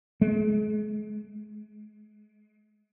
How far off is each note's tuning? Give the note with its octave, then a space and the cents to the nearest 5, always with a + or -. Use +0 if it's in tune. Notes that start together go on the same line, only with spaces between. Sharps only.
G#3 +35